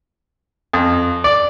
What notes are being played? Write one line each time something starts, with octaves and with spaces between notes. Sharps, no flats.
F2
D5